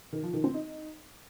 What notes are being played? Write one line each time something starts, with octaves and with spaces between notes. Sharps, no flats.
D#3
F3
D#3
C4
D#4